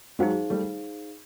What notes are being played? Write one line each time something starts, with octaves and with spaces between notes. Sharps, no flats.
F#3 G#3 D#4 G#4 C5 F5
G3 A3